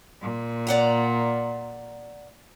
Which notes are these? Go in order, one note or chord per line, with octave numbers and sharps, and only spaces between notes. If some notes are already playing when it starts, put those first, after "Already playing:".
A#2
D5 F#5 A#5